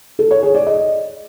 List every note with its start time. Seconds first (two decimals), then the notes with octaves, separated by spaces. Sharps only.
0.19 A4
0.31 C#5
0.43 G#4
0.55 D5
0.66 D#5